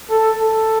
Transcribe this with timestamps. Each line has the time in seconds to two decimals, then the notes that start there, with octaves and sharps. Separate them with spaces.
0.10 A4
0.40 A4